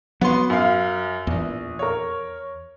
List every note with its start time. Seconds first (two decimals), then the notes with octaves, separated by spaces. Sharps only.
0.21 F#3 B3 C6
0.50 F#2 F5
1.27 A#1 E2
1.79 A#4 C#5